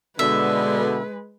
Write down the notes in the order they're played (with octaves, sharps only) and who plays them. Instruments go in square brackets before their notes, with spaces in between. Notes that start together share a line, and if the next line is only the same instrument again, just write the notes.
[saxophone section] B2 D3 [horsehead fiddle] G#3 B4 [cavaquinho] E5